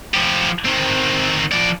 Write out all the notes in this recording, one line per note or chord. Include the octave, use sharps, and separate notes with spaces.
F3 G4
D#3 C4
F3 D5